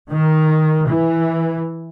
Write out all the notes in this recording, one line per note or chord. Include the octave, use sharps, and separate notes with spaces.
D#3
E3